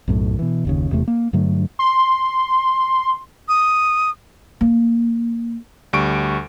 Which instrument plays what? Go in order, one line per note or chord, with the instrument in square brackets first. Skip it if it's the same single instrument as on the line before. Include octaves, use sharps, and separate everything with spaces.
[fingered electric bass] B1 F#2 A2
B2 E3
F#1 D#2 C#3
E1 E2 C3 A3
A#3
G2 D3 F#3 A3
[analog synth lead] C6
[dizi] D#6
[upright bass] A#3
[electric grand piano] D2 G3 C#6 D7